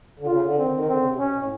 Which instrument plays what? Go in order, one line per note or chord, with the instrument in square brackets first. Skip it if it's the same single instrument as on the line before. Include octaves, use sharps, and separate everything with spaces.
[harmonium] D3
[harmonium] C#3 [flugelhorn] F4
[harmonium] D3
[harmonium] D#3 [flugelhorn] C4
[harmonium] D3
D#3
C#3
[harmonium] D3 [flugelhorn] C4
[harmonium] C#3
C3
[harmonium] B2 [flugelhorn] C#4
[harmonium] B2
A2